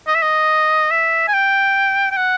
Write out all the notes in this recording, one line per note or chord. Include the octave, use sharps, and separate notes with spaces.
D#5
E5
D#5
E5
G#5
G5
G5
F#5